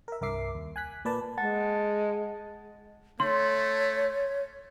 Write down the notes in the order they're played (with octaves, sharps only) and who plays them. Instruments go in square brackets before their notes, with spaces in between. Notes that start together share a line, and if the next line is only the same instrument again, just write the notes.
[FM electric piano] A#4 E5
C2 G2 A#4 E5 D6 C7
D#2
G#5 F#6 B6
A#2 A#3 B4 D5 A5
[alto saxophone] G#3 [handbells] F#5 A5 A6
[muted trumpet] A3 [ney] C#5 [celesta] C6